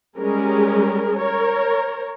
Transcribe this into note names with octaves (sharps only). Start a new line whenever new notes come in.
G3 G#3 C#4 G#4 A#4
A#4 C#5